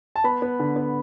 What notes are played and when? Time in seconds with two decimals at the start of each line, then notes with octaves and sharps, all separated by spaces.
0.16 A5
0.24 B3 B5
0.42 B3
0.59 D3
0.76 B3